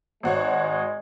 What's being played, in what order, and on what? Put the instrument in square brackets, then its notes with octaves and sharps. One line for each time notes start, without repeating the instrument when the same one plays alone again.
[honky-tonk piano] G#1 F#4 C#5 [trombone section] G#3